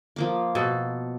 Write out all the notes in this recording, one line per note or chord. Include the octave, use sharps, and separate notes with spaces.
F3 A#3 D6
B2 A4